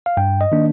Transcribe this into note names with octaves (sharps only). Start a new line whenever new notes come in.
F5
G2 G5
D#5
D#3 A#3 D4